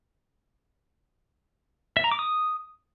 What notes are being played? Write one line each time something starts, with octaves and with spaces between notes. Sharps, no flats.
E5
A#5
D6
D#6